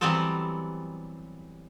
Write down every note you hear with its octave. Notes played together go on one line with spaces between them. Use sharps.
E3 F#3 G3 B3 C4 A4